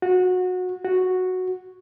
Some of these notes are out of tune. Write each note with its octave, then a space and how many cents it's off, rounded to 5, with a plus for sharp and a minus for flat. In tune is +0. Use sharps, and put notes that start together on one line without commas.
F#4 -20
F#4 -5